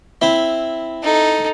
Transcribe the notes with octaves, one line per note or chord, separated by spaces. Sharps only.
C4 E4
D#4 A4